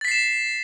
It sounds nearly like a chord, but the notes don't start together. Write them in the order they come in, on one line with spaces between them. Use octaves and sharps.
A6 B6 C7 E7